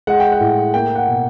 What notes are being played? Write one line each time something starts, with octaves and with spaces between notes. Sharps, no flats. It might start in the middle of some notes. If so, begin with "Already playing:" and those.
G#3 F#5
G5
F#5
A2
A#3 G5
F#5
B2